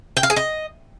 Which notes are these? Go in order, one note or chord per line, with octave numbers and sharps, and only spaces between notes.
G5
F5
G#4
D#5